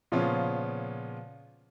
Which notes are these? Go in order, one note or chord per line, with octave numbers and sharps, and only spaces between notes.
A#2 C#3 F3 B3 C#4 F4